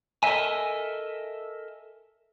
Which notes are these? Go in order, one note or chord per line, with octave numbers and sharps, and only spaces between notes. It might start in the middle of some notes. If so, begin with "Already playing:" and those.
A4 A#4 C#5 D#5 E5 G#5